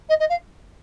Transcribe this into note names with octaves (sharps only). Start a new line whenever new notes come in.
D#5
D#5
F5